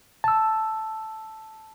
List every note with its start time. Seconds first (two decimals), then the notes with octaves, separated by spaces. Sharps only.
0.24 A5 E6